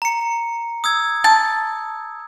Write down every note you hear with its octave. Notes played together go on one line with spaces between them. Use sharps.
A#5 C#7
D#6 E6 G#6
A5